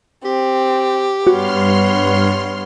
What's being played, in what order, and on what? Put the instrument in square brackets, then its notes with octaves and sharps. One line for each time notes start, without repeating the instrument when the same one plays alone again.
[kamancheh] C4 [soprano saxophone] G4
[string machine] G2 C6 F6 [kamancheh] B3 C#5 [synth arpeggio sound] F#4